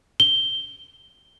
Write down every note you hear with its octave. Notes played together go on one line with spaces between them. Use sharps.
G7